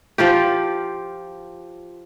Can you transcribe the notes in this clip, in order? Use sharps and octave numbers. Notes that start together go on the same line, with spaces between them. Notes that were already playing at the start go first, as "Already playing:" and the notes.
F3 F4 G4